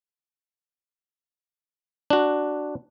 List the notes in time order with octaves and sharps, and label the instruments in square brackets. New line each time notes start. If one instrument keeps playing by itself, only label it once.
[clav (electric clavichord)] D4 F#4